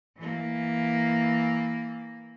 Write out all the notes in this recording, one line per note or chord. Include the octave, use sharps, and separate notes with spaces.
E3 A#3